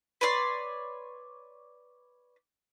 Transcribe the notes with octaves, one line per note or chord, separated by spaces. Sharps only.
B4 C#5 D5 C6